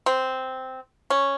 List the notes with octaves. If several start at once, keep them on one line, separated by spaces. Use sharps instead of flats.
C4
C#4